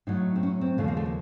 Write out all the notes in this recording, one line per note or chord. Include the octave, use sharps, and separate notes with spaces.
A2 F#3 D#4
C4
C#4
C4
D#2 C#3 F3 A3
A#3
A3
A#3